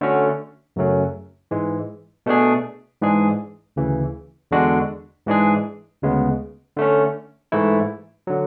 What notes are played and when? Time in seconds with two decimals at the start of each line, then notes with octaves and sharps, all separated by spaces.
0.01 D3 A3 C#4 F#4
0.76 F#2 C#3 F#3 A3 C#4
1.51 G#2 E3 G#3
2.26 B2 A3 D4 G#4
3.01 G#2 E3 G#3 D4 G#4
3.76 D2 C#3 E3
4.51 E2 D3 G#3 D4 F#4
5.26 G#2 E3 G#3 D4 G#4
6.02 D2 C#3 G#3 B3
6.77 D3 A3 C#4
7.52 G#2 E3 A3 E4
8.27 D3 F#3